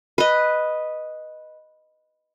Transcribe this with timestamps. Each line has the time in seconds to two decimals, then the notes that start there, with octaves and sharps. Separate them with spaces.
0.18 B4 D#5